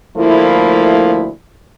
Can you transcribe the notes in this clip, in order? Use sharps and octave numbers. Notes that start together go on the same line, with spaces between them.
D2 F3 A3 A#3 E4